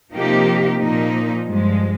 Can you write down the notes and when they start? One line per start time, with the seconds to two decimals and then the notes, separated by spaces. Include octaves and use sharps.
0.13 C3 F3 A#3 D#4 G4
0.79 A#2 F3 A#3 D#4
1.45 G2 F3 G#3